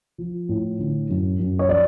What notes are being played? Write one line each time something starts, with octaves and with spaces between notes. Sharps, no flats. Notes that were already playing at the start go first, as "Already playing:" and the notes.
F3
A2
D3
F#2
F#2
C#5
F3 D5